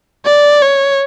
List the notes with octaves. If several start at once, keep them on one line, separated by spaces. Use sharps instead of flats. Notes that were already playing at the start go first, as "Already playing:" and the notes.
D5
C#5